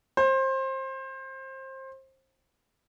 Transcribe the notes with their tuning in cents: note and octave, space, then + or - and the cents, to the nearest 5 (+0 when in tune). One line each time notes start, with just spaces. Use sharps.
C5 +25